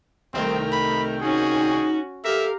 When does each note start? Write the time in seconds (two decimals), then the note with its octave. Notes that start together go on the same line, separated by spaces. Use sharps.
0.34 C2 D#3 A3 C4 A#4 G5
0.72 B5
1.21 C#4 D#4 F#4 G#4
2.25 G4 A4 A#4 E5 F5